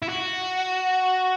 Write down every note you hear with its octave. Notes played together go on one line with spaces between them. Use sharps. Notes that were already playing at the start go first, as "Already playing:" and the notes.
E4
F#4